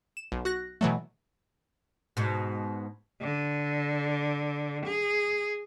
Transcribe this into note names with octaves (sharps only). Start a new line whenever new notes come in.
E7
B1
F#4 F#6 A#6
B2 E3 F#3 A3
G#2 B2
D3
G#4